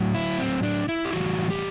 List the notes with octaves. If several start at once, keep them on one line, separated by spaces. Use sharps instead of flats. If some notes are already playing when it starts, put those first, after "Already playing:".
Already playing: A2 F#3
E4
C4
D4
E4
G4
A2 E3 G3 F#4
G4